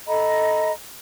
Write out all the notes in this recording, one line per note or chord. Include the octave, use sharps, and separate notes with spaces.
A4 D#5 A#5 B5